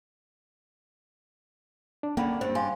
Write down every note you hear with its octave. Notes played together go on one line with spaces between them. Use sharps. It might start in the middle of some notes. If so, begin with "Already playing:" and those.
D4
D3 A#3 C#4 G5 B5
G2 C4 C5
G4 F5 G#5 C6